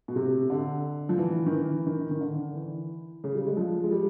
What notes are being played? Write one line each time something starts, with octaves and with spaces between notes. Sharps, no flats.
B2
C3
D3
F3
E3
D#3
E3
D#3
D#3
D3
E3
C#3
G3
G#3
F3
G#3
G3